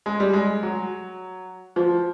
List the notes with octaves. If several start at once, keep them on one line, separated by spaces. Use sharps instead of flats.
G#3
G3
G#3
F#3
F3